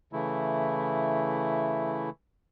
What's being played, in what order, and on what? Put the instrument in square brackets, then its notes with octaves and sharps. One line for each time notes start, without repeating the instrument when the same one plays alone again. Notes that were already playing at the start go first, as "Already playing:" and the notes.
[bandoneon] C#3 E3 A3 E4